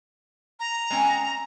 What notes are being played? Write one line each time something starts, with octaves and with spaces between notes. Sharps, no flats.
A#5
G#3 C4 C#4